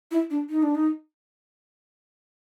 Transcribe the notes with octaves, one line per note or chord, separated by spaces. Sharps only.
E4
D4
D#4
D4
D#4